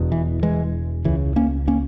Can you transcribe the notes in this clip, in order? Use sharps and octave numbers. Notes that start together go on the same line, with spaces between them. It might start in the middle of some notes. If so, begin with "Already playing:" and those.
Already playing: E1 E2 B2
E3
E3 G#3
C#2 C#3 E3
A#3 C#4
A#3 C#4